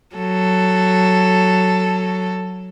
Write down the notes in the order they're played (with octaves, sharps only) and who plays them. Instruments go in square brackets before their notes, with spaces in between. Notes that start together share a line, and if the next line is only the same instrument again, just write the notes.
[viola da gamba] F#3 A4